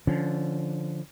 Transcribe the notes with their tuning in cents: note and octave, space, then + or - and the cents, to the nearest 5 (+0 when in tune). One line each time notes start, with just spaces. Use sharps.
D3 +0 F3 -5 C#4 +20